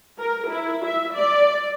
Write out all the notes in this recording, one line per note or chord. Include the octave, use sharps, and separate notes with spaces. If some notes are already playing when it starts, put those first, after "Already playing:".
A#4
E4
E5
D5